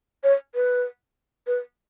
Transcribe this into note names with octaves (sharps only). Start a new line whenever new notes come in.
C#5
B4
B4